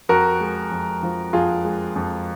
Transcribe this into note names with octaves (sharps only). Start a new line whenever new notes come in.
F2 F#4 A#4
G#3
F2
F3
F2 F4 G#4
G#3
F2